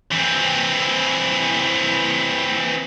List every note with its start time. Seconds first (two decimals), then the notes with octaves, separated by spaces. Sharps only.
0.11 E3 C4